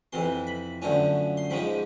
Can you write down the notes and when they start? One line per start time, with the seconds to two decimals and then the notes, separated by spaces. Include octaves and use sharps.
0.13 F2 C3 E3 C6
0.47 B5
0.82 F#2 D3 F3 A3 C#4
1.37 C6
1.50 G#2 F3 G#3 C#4 B5